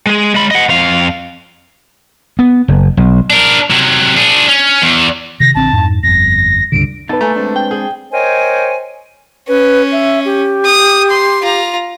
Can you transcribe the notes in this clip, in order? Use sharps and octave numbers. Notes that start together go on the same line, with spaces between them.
G#3 G#4
G#3 B5
D#5 F#5
F2 F5
B3
F#1
B1
D4 A#4
C3 F#3
D4 G#4
C#4
E2
C3 D#3 A#6
A#1 D3 C4 A5
F2 G#2
G1 F2 A#6
C#2 G2 D3 D7
B2 D#4 A4 B4 A6
A3 A#3 G#5 A#5
G#3 C4 D4
G5
G#4
A#4 C5 C#5 D#5 G5 G#5
C#4 B4
E5
G4
D#6
C6
F4 A#5